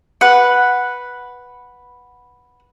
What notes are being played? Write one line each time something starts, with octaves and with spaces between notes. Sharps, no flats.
B4 F#5